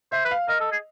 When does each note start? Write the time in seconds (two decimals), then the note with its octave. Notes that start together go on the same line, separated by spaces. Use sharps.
0.12 C5 E5
0.25 B4
0.31 F5
0.48 A#4 D#5
0.60 A4
0.72 G#4